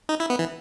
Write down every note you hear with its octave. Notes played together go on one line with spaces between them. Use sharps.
D#4
E4
B3
E3